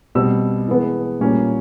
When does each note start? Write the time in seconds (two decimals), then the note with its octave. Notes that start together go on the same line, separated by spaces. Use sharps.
0.15 B2 G3 C4 E6
0.68 E3 G#3 B3
1.21 A#2 G3 A#3 C#4